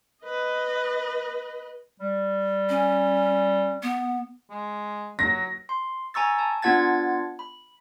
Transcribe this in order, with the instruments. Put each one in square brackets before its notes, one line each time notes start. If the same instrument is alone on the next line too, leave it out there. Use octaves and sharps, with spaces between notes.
[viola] B4 D#5
[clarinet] G3
[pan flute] C#4
B3
[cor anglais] G#3
[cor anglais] F#3 [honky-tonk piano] A#6
[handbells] C6
G#5 A#5 C#6 E6 A6
A5
B3 D4 F4 F#5 G#6 A6
B5